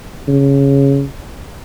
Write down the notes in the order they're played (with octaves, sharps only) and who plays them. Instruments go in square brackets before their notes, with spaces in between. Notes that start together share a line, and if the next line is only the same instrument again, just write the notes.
[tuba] C#3